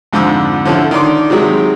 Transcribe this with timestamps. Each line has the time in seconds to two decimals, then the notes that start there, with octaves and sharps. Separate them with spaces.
0.13 F2 G#2 D3 F3 D6 E6
0.65 D3 F3 C#4 E4 A4
0.91 D#3 D4 C6 D6
1.30 C3 D#3 F#3 G#3